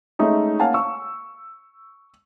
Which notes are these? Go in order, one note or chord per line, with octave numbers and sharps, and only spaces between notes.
G#3 A3 C#4 D#4 E5
A#3 C#4 F5 F#5 G#5 A5
C#6 E6